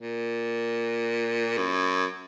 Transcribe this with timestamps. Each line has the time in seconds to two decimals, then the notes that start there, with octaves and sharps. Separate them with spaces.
0.01 A#2
1.58 F#2